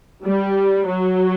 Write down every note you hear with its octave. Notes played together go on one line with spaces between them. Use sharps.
G3
F#3